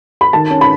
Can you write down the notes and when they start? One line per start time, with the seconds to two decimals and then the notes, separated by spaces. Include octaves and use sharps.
0.21 B5
0.33 D#3 A5
0.50 C#4
0.61 B5